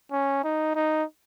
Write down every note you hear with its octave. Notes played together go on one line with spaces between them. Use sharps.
C#4
D#4
D#4